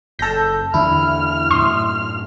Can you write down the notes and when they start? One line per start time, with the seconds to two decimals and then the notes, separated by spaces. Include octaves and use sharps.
0.19 F#1 A4 E6 G6 A#6
0.74 E2 D3 D4 E4 F6
1.51 F#2 A2 C6 D#6
1.86 F6